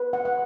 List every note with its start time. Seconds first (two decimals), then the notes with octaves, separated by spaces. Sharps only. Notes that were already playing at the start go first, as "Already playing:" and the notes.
Already playing: B4
0.13 F#5
0.25 F#5